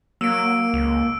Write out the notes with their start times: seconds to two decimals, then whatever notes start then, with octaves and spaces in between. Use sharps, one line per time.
0.21 F#3 A#3 E6 D7
0.74 C#2